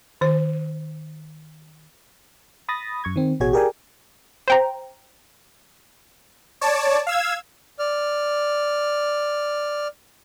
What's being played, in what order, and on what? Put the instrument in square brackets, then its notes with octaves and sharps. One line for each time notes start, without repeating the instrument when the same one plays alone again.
[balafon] D#3 C5
[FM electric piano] B5 D#6 A6 A#6
F#2 C#6 G#6
D#3 C4
A1 B2 F#4 G#4 C#5 G#6
G4 G#4 A#4 D5 G5 G#5
[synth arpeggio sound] C5 G5 A#5
[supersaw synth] C#5 D5 A5
F5 E6 G#6
[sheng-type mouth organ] D5 F6